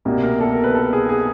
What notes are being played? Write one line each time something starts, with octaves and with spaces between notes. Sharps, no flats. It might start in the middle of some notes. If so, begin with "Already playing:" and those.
C2 B2 G3 A#3
A#4
A4
A#4
B4
A4
G#4
G#4